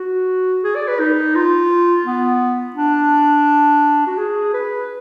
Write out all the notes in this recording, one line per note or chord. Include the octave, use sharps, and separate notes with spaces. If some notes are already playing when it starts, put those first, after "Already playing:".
Already playing: F#4
G#4
D5
B4
D#4
F4
B3
D4
F#4
G#4
B4